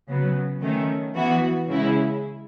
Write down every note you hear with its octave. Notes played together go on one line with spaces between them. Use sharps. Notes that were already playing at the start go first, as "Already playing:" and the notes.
C#3 F#3 B3
D#3 A3 C#4
E3 B3 F#4
C#3 G#3 C#4 E4